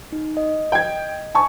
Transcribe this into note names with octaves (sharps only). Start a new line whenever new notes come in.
D#4
D#5
G5 G#6
G#5 A5 C#6